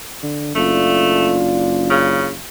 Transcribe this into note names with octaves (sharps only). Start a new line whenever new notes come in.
D3
F#1 A3 D4 F4
C#3